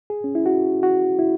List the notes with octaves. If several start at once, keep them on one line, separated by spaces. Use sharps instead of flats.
G#4
C#4
E4
F#4
F#4
E4